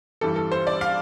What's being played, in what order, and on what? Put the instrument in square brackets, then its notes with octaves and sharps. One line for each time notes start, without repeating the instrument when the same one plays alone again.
[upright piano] G2 E3 G3 A4
A4
C5
D5
F5